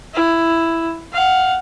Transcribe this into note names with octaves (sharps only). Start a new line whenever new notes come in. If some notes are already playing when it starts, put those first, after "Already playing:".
E4
F5 F#5